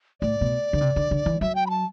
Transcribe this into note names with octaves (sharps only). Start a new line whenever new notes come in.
A2 D5
B2
D3
C3
D3
D3
E3
F#3 E5
G5
B5
A5